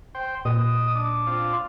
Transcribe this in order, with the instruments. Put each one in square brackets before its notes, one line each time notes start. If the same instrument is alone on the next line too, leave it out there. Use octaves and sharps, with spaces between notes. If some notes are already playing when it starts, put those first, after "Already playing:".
[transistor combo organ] C5 G5
[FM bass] A#2 [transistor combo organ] D#5 D#6
[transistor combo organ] D4
C4 D4 F4